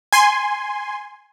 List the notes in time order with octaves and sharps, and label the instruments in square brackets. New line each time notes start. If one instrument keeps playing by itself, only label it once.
[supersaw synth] G#5 C6